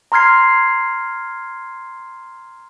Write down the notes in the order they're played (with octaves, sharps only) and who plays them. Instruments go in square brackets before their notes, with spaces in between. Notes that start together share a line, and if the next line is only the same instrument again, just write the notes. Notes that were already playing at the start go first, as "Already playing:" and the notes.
[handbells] A#5 C6 F6 G#6 C7